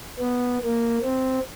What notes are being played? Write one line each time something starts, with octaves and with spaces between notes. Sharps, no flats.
B3
A#3
C4